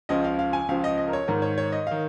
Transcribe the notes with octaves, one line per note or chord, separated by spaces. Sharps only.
C#2 C#3 F3 D#5
F5
F5
G#5
C#2 C#3 F3 F5
D#5
D#5
A#4
C#5
G#2 D#3 A#4
C#5
C#5
D#5
D#3 F5